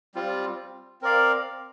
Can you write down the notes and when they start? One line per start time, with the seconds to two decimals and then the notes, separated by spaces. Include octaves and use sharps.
0.15 G3 C4 F4
1.02 C4 A#4 D5 F5